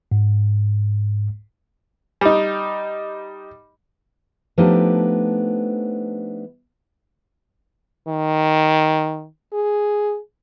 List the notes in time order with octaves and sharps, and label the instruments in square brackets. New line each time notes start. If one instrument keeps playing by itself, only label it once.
[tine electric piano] G#2
[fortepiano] G3 D#4
[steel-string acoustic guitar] F3 A3 B3 D4 D#4 G4
[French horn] D#3
G#4